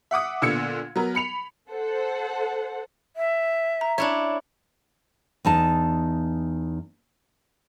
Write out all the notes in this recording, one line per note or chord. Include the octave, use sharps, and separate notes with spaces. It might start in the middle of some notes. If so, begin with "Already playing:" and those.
E5 F#5 D6 D#6
A#2 D3 B3 E6 G#6 C#7
F#3 B3 A#4
B5 C#7 F7
A4 C5 F#5
E5
A#5
D4 E4 C#5 E5
E2 D#4 A5